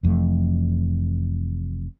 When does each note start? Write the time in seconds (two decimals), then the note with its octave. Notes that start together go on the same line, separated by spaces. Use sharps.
0.03 F1 F2 E3 A3